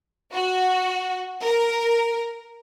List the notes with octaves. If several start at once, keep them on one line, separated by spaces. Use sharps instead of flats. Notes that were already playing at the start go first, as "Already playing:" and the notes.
F#4
A#4